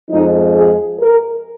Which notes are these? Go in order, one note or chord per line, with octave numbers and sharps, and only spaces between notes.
F2 F3 G#3 D#4
G#4
A#4